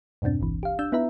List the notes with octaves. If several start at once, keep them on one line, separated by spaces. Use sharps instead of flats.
E2 G2 B2 C4 D4
G1 C#2 E3
G4 F5
D4 E6 G6
B3 D#4 E4 B4 E5 A#5